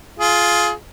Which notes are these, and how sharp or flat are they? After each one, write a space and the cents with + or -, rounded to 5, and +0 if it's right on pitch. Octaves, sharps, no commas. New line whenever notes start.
F4 +0 G#4 +25